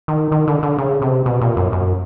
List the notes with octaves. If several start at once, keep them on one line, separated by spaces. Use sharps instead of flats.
D#3
D#3
D3
D3
C#3
C3
B2
A#2
F#2
F#2